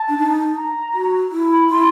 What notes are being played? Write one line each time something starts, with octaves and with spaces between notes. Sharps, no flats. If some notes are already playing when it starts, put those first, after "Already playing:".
Already playing: A5
D4
D#4
A#5
F#4
E4
B5
E4 C6